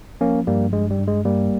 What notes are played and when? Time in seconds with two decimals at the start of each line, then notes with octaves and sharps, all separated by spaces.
0.21 F3 A#3 C#4
0.47 G2 G3 A#3
0.73 G2 G#3
0.91 G3
1.00 G2
1.08 G#3
1.25 G2 G3 A#3